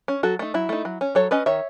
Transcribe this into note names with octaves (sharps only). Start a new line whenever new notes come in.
C#4
F#3 F#4 A4
A3 D#4
F#3 E4
A3 D#4
F#3
C#4
F#3 A4 C#5
C#4 B4 D#5
D#3 C#5 E5